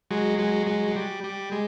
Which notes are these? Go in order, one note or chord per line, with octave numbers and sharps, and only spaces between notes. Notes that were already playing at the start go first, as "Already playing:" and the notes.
F#3 G#3
F#3 G#3
F#3 G#3
F#3
G3
G3
G#3